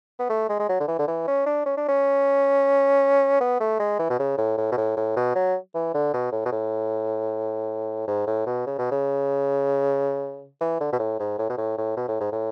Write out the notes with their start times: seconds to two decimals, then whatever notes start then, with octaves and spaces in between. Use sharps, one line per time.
0.19 B3
0.30 A3
0.49 G#3
0.59 G#3
0.69 F#3
0.80 D3
0.88 E3
0.99 D3
1.08 E3
1.28 C#4
1.46 D4
1.66 C#4
1.77 D4
1.88 C#4
3.40 B3
3.60 A3
3.80 G#3
3.99 E3
4.10 B2
4.19 C#3
4.38 A2
4.58 A2
4.72 B2
4.77 A2
4.97 A2
5.16 B2
5.35 F#3
5.74 E3
5.94 D3
6.13 B2
6.32 A2
6.46 B2
6.52 A2
8.08 G#2
8.27 A2
8.46 B2
8.67 C#3
8.78 B2
8.91 C#3
10.61 E3
10.81 D3
10.93 B2
10.99 A2
11.19 G#2
11.39 A2
11.49 B2
11.58 A2
11.78 A2
11.97 B2
12.08 A2
12.20 G#2
12.32 A2